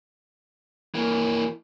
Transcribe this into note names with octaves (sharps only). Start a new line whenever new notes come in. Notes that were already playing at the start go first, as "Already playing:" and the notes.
E3 A#3